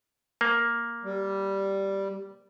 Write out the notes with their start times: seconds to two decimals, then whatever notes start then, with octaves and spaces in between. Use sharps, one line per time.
0.41 A#3
1.04 G3